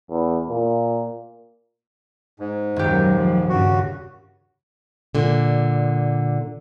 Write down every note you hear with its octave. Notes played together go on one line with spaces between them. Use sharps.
E2
A#2
G#2
D#1 F#2 F#3 G4
F3
G2 C#3 F#4
A#2 D3